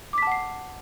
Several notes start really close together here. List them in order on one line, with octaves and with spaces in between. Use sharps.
D6 B6 A5 F#5 C7